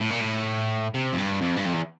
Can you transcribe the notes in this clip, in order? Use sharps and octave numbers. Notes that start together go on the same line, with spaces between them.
A2
A#2
A2
C3
F2
G2
F2
G2
F2
E2